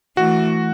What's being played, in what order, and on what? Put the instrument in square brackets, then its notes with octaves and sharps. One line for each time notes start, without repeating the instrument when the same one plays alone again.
[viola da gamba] E3 A3 [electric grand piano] F#4